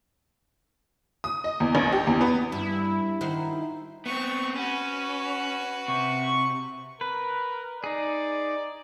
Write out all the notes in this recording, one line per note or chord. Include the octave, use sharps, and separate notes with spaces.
D#6
D#5
E2
A1
G4
E2
B3
G2 E4
D#3 F#4 C5
B3 C4 C#6
C#4 F#4 B4
C3 C#6
A#4 B4
D#4 G#4 D5